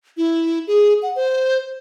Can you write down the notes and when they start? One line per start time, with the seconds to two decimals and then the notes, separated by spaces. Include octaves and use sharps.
0.17 E4
0.67 G#4
1.02 F#5
1.16 C5